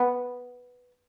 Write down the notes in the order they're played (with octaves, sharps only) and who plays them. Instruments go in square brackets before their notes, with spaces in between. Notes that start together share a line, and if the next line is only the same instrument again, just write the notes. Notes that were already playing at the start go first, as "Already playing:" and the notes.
Already playing: [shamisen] B3